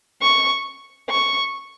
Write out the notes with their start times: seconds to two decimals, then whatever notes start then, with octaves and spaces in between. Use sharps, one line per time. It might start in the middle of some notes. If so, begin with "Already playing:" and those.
0.22 C#6
1.10 C#6